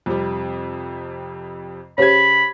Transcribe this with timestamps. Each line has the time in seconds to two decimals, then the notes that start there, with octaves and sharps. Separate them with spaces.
0.06 F2 C3 G3
1.98 C#3 G4 C5 C#5 B5 G#6